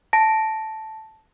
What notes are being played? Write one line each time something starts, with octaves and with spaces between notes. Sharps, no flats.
A5 A#6